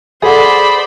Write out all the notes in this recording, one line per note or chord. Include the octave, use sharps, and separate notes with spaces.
G#4 A4 C5 D5 F#5 B5